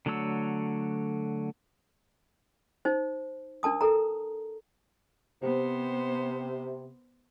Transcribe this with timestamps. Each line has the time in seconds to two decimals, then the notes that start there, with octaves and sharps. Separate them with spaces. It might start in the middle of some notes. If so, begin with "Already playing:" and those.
0.06 D3 F#3 A3 C#5 E6
2.85 D#4 C5
3.63 D4 A#4 A5 D#6
3.81 A4 A#4 A#5
5.42 C3 B3 C5